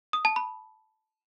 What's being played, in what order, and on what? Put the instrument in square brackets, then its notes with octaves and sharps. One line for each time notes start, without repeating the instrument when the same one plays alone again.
[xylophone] D#6
A5
B5